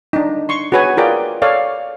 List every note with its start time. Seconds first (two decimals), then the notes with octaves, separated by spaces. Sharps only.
0.13 D4 D#4
0.49 C6 C#6
0.72 F#4 G#4 B4 C#5 G#5
0.97 F4 G#4 A#4 D5 G5
1.42 A4 C#5 D5 F5